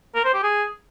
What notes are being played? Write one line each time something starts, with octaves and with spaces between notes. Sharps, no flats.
A#4
C5
G4
G#4